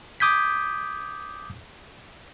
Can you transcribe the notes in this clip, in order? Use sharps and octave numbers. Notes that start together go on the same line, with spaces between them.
D6 D#6 G6 G#6 B6